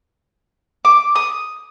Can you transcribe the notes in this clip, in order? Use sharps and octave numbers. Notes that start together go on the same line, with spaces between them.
D6
D#6